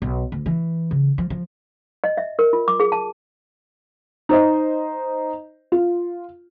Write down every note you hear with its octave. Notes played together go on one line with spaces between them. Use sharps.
B1
D2
E3
C#3
F3
F3
D#5
E5
A#4
F4
D6
G#4
A5
D#4 C5 D#5
F4